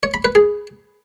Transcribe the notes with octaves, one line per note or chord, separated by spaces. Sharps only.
C#5
B5
B4
G#4